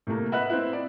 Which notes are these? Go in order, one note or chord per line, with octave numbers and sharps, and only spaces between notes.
A2 C3 A3 A#3
B4 D#5 E5 F#5 B5 F#6
C4 E4
D5